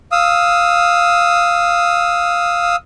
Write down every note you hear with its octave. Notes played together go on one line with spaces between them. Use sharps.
F5 D#6 E6